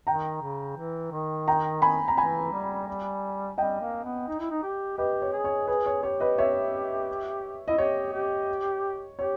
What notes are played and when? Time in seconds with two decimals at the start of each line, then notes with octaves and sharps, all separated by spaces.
0.07 D#3 G5 A#5
0.42 C#3
0.77 E3
1.12 D#3
1.48 G5 A#5
1.82 G#5 B5
2.08 A#5
2.17 E3 G#5 B5
2.52 G3
2.88 G3
3.58 G3 D#5 G5
3.81 A#3
4.04 B3
4.28 D#4
4.39 E4
4.51 D#4
4.63 G4
4.98 G4 B4 D#5
5.22 C#5
5.33 G#4
5.44 C#5
5.67 G#4 B4
5.86 C#5
6.03 G4 C#5
6.20 B4 D#5
6.38 C#5 E5
7.68 E4 D#5
7.78 G4 C#5
8.13 G4
9.19 G4 C#5